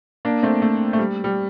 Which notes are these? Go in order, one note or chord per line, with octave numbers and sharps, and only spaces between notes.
A#3 D4
A3 C4
A3
A3
G3
G3